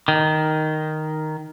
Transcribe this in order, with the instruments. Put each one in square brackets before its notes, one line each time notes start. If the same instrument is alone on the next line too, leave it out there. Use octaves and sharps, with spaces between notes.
[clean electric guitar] D#3